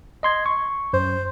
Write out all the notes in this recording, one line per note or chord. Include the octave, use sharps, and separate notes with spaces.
D#5 C6 G#6
C#6
F#2 C5